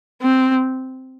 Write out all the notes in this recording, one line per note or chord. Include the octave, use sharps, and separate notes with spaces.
C4